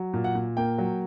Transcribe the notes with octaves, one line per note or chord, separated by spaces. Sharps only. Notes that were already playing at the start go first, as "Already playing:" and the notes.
Already playing: F#3
A#2
F#5
A#2
A#3 G5
F#3